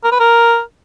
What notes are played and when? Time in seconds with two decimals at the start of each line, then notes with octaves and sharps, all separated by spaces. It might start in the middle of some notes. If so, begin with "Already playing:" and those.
0.04 A#4
0.12 B4
0.20 A#4